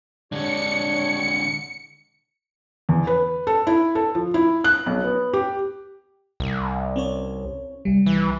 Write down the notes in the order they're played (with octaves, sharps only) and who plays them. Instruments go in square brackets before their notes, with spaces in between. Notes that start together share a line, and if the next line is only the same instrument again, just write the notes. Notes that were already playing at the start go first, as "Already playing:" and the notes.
[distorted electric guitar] D3 G#3 [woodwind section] D4 G4 C#5 [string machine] C#7
[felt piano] E2
B4
A4
E4
A4
F3
E4
F#6
B1
B3
G4
[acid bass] C2
[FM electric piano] C4 C#4 C#5
C2 G3
[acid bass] E3